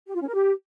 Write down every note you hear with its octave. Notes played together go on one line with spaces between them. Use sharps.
G4
F4
C#4
A#4
G4